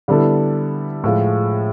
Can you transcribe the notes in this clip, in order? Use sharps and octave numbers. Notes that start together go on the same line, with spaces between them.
D3 G3 B3 E4 A4
A2 F3 G#3